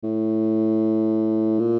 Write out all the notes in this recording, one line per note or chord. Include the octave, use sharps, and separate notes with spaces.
A2
A#2